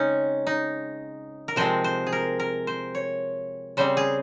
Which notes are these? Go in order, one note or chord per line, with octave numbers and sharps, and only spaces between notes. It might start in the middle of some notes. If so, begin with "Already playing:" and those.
Already playing: C#3 G#3 C4 C#4 D#4
D#4
A#4
C3 F3 G#3 C4 C5
C5
G#4
A#4
A#4
C5
C#5
C#3 G3 C4 C5
G#4